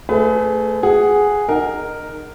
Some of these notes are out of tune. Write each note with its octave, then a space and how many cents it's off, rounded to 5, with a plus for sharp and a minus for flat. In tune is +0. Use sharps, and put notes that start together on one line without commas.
A3 +10 G#4 +25 B4 +40
G#4 +0 F#5 +0
D#4 -20 A#4 +0 F#5 +20